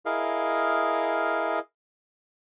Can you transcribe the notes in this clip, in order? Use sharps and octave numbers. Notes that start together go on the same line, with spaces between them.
E4 G#4 A#4 D#5 F5